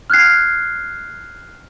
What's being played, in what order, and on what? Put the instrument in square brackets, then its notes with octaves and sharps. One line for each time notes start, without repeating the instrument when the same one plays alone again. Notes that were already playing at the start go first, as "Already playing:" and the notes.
[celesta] F6 F#6 G#6 C7